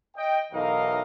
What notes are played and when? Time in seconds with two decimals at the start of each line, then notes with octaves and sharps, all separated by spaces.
0.17 D#5 G5
0.53 B1 E3 D#4 A#4 D#5 F5